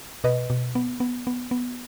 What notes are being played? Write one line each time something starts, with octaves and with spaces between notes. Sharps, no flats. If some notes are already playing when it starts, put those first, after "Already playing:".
B2 B4 D#5
B2
B3
B3
B3
B3